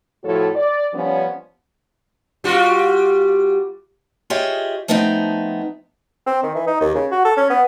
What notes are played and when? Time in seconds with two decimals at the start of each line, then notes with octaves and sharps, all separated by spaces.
0.24 A2 F3 E4 F#4 A4 C#5
0.56 D5
0.94 F3 G3 B3 C#4
2.44 G3 F4 F#4
4.30 F4 G4 G#4 C#5 D#5 E5
4.88 F3 A3 B3 C4 D#4
6.26 C4
6.43 D#3
6.55 E3
6.67 D#4
6.80 D#2
6.94 C#3
7.11 F#4
7.25 A4
7.37 C#4
7.50 B3